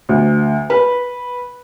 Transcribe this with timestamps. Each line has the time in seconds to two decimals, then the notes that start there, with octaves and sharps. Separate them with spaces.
0.09 D2
0.70 B4